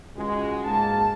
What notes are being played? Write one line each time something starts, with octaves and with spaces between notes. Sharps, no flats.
C#2 G#3 F#4
G#2 G#3 A#3 A5